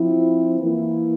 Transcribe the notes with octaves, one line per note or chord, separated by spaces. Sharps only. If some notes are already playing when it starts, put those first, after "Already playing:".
Already playing: F3 C4 E4
E3 A#3 E4